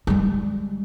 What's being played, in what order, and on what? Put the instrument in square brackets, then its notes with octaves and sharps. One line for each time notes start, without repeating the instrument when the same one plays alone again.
[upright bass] G3 G#3